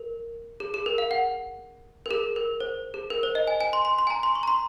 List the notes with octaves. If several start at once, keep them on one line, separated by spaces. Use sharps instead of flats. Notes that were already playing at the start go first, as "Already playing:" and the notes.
Already playing: A#4
G#4
G#4
A#4
F5
F#5
A#4
G#4
A#4
C5
G#4
A#4
C5
D#5
G#5
G#5
C6
C6
C6
G#5
A#5
C6
C#6
A#5
C6